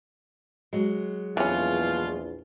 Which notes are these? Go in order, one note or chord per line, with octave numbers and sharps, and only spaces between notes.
F#3 G#3
A#1 E2 B2 E3 C#4 F4